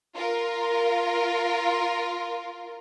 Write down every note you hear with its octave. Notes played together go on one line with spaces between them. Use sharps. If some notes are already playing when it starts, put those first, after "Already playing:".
F4 A#4